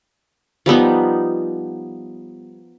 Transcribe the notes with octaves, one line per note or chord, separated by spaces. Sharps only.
F3 G3 B3 D#4